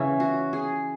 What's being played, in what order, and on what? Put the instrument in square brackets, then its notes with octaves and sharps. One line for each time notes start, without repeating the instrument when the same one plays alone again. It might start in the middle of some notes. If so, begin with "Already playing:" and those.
Already playing: [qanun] C#3 E3 C#4 E4
F#4
G#4